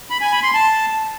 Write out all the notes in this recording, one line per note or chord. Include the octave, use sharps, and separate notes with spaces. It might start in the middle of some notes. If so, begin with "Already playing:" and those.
B5
G#5
B5
C6
A5